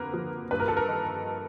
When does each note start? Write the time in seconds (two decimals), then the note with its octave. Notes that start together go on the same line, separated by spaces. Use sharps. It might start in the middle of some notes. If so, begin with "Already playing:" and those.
Already playing: F2 D3 A#3 A#4 B4
0.13 F3
0.51 G2 B4
0.60 A#4
0.68 A4
0.77 A#4
0.88 D#3